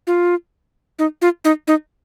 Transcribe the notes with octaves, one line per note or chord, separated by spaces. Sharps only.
F4
D#4
F4
D#4
D#4